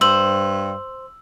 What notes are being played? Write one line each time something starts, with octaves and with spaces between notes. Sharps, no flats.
G2 C5 E6 F#7